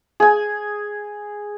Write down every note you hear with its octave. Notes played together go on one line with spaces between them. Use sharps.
G#4 G#5